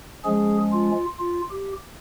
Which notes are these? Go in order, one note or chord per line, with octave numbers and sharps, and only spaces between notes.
F3 G#3 C#4 G#4
F4
F4
G4